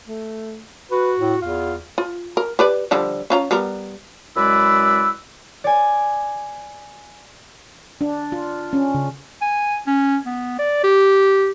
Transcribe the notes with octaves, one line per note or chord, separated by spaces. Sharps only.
A3
F#4 B4
A2
E2 F4
F4
A#4
G4 B4 D5
D3 F3 G3
C#4 F4 A#5
G3 B3 A#4
F#2 G#3 E4 B4 D5 E6
D5 G#5
D4
F4
C#4
C#3
G#5
C#4
B3
D5
G4